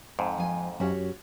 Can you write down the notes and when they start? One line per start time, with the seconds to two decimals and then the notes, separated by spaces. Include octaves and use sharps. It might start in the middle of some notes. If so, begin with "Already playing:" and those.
0.19 F2 G#2
0.38 F3 G#5
0.80 F#2 C#4 F#4 G4 C#5